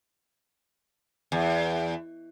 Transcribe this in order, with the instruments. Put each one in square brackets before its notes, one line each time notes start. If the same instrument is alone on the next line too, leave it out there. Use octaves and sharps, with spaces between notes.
[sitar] E2